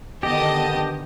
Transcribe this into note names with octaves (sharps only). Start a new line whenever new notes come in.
D3 D#3 B3 G4 D#5 A5